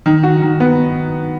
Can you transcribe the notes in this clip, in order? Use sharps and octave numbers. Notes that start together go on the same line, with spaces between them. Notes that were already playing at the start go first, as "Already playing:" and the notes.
D#3
F#4
D#3
B3